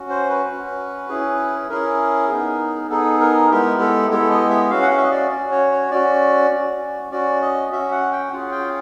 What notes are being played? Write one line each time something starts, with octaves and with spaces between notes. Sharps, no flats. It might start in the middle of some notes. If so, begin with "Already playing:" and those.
Already playing: C#4 F#4
C5
B4
C#4 F#4
C#4 E4 G#4
C#4 E4 G#4 A#4
B3 D#4 G#4
B3 D#4 G#4 A4
A#4
G#3 B3 E4 G4 A#4
A4
G#3 B3 E4 G4 A4
D#5
E5
C#4 F#4 F5
F#5
F5
E5
D#5
D5
C#4 F#4 D5
C#5
C#5
C#4 F#4 D5
C#4 F#4
C#4 F#4 D5
D#5
C#4 F#4 E5
F#5
G5
C#4 F4 G#4 F#5
G5